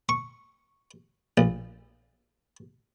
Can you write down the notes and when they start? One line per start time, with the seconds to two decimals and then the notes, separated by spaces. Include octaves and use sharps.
0.09 C#6
1.38 A#1